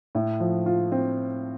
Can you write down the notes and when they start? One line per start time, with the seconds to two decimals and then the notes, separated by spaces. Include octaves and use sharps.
0.15 A2
0.40 F3
0.66 F4
0.92 C4